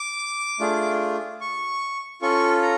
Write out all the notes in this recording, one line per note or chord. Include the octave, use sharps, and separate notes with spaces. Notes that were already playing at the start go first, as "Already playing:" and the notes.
Already playing: D6
A3 D4 F4 G#4
C#6
C#4 F4 A4 C#6
A#5